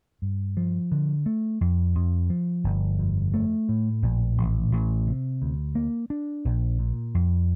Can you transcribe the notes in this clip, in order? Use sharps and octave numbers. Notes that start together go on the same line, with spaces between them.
G2
F3
D3
A3
F2
F2
F3
G1
F2
A3
A2
A#1
A1
A1
C3
D2
A#3
D4
A#1
A#2
F2